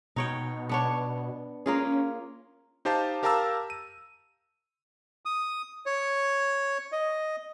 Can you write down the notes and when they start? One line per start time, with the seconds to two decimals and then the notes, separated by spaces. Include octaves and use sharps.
0.16 B2 D#4 C#5 G5
0.69 B3 D4 C#5
1.66 A#3 C#4 F4 G#4
2.85 D#4 G4 C5 F5 A5
3.23 G4 A#4 F5 A5 A#5 E6
3.70 D#7
5.25 D#6
5.86 C#5
6.92 D#5